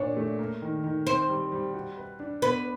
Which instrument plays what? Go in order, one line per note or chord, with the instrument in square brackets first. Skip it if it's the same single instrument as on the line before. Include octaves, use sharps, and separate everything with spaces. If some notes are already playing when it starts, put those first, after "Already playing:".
Already playing: [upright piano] A#2 D4 [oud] C#5
[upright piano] A3
A#3
D#3
D#3
[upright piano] C4 [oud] C5
[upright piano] G3
G3
F#4
B4
D4
[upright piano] B3 [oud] B4